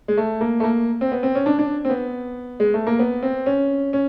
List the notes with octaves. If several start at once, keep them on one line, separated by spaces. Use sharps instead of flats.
G#3
A3
A#3
A3
A#3
C4
B3
C4
C#4
D4
D4
C4
B3
G#3
A3
A#3
B3
C4
C#4
C#4